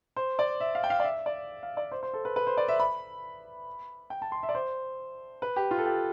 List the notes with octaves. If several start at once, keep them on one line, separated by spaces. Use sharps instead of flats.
C5
D5
E5
F5
G5
F5
D5
E5
D5
F5
D5
C5
C5
A4
B4
B4
C5
D5
E5
B5
G5
A5
C6
E5
D5
C5
B4
G4
F4
A4
G4